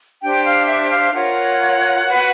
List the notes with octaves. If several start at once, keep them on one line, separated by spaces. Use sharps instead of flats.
D4 G4 C5 G5
F5
E5
F5
F4 A#4 C#5 F#5
F#4 B4